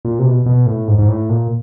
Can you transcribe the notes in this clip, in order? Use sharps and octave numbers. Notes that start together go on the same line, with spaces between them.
A#2
C3
B2
B2
A2
G#2
G#2
A2
A#2